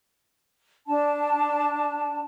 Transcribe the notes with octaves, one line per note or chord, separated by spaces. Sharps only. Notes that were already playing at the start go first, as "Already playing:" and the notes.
D4 A5